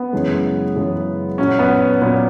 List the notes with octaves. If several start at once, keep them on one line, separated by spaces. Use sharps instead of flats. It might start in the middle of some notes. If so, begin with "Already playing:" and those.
Already playing: B3
F#2 C#3 E3 G#3
F#2 C#3 E3 G#3
A#2 F#3 C#4
B3
A#2 F#3 B3